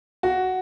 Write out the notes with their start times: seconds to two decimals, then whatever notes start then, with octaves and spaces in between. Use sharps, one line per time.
0.23 F#4